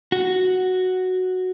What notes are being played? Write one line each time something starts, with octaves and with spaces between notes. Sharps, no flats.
F#4